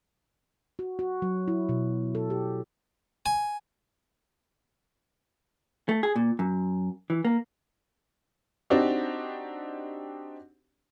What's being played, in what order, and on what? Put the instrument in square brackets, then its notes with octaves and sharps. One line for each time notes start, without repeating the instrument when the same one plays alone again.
[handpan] F#4
F#4
F#3
E4
B2
A4
G4
[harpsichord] G#5
[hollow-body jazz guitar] A3
G#4
A#2
F#2
E3
A#3
[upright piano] C4 D4 D#4 F#4 G4